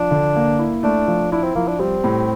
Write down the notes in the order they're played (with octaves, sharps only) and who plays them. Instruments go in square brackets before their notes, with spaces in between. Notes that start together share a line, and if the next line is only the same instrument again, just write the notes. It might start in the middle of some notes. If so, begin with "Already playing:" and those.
Already playing: [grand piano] F3 [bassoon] D4
[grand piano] D3
A#3
E4
[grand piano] A3 [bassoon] D4
[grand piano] F3
[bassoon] D4 [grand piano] E4
[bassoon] C4
[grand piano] F3 [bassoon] A#3
[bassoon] D4
[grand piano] G3 [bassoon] C4
[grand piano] A2